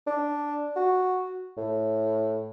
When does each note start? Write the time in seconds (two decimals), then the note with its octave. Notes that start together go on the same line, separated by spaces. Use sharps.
0.07 D4
0.76 F#4
1.57 A2